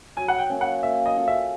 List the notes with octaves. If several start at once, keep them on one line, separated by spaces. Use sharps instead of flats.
F#3 G#5
F#5
G5
A#3 C#4
F#5
A#3 E5
D#5
C#4 F4 A4
E5